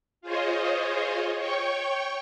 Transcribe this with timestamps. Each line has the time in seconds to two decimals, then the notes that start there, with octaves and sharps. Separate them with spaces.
0.21 F4 G#4 C5 C#5 D#5
1.37 C#5 G5 C#6